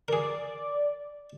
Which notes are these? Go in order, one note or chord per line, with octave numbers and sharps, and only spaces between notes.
G#4 A#4 D5